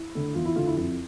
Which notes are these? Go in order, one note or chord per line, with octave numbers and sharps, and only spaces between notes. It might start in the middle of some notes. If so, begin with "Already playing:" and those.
Already playing: E4
D3 A3
E2 F4
E4
D3 A3 F4
E4
F2 E4